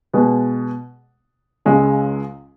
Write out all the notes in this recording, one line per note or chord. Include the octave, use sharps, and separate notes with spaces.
B2 G#3 B3
C#2 C#3 G#3